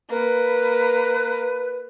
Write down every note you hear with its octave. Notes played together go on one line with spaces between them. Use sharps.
A#3 B4